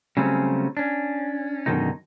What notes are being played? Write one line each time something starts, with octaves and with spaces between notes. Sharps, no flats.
C#3 F#3 G3 A3 C4 C#4
C#4 D4
F#2 B2 D3 D#3 G#3 D#4